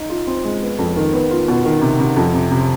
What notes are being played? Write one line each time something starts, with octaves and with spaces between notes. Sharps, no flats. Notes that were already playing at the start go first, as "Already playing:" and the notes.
Already playing: D#4
F4
C4
G#3
B3
F2
D#3
B3
F4
B2
D#3
C3
C3
F2
C3
C3